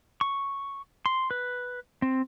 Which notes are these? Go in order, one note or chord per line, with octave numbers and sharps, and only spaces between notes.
C#6
C6
B4
C4